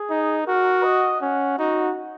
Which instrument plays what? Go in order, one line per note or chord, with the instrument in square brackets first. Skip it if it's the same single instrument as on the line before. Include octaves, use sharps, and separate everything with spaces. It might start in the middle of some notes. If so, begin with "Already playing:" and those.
Already playing: [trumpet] G#4
[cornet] D#4
[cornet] F#4 [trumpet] A#4
[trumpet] D#5
[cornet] C#4 [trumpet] F#5
[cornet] D#4 [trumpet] F#4